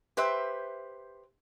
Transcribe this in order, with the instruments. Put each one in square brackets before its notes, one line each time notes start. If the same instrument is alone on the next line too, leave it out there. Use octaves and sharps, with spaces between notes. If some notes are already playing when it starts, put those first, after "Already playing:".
[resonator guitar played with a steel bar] G4 B4 C5 E5